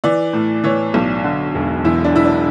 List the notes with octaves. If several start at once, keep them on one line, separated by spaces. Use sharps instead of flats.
E3 D5
A2
E3 C#5
B1
D3
E1
E2 E4
D4
E1 E4
D4